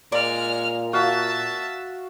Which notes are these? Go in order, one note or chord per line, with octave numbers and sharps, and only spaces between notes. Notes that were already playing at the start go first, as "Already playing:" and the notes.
A#2 G#3 A#4 D5 F6
F#4 E5 F5 A5